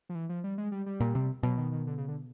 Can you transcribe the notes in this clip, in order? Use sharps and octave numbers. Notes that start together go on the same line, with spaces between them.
F3
E3
F3
G3
G#3
G3
G3
A#2
C3
B2 F#3
D#3
D#3
D3
C#3
D3